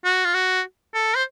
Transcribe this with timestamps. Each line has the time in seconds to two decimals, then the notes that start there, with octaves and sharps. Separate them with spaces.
0.05 F#4
0.25 F4
0.34 F#4
0.94 A4
1.16 C5